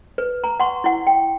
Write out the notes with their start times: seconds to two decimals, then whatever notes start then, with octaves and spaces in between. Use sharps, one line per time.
0.18 B4
0.44 A#5
0.60 F#5 C6 C#6
0.84 E4 F#5
1.07 G5